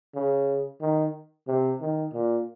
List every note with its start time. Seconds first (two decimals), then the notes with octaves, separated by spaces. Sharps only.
0.15 C#3
0.81 D#3
1.48 C3
1.81 D#3
2.14 A#2